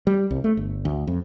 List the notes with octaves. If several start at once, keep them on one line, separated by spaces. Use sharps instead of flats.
G3
C2
A3
G1
D2
F2